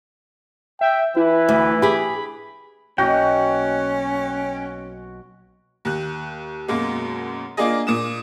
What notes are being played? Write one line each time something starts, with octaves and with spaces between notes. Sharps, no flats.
E5 G5
E3 E4 B4
D2
G4 G#4 B5
B1 A#3 C#4 F#4 D#5 G5
D#2 F#6
F#2 B2 G#3 A#3
A#3 D4 F4 G#4 D#5
A#2 D#6 E7